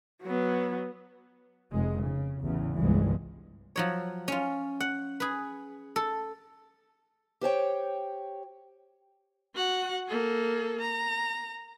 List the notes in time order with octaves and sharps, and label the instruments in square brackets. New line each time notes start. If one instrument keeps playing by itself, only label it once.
[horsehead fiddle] F#3 B3
[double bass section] F1 G#3
C#3
A1 E2 C#3
G1 C2 G2 E3 F3 G#3
[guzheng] F3 F#3 C#5
C#4 F4
F#5
G#4 B4
A4
[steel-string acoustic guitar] G4 C5 C#5 G5
[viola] F#4 F#5
A#3 A4
A#5